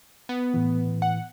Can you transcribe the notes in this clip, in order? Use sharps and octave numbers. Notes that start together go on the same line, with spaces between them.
B3
A2 E3
F#5